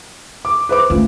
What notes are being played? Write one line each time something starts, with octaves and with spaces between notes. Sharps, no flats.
D6
B4 C5 D6
A3 C#4 F4